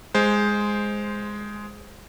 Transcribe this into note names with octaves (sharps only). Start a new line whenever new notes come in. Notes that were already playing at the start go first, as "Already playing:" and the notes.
G#3 C5